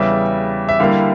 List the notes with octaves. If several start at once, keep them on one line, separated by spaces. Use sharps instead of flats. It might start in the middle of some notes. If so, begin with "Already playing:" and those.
Already playing: E2 C#3 G3 E5
E5
D3 G3 A#3 E4 F5